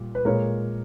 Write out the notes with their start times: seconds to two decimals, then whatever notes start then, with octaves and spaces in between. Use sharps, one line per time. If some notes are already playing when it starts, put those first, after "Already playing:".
Already playing: A#2 G3
0.15 B4
0.25 A#2 G#3 A#4 C#5